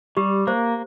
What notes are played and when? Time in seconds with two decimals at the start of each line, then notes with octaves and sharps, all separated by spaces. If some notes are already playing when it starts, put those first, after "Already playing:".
0.17 G3 G4
0.47 A#3 C5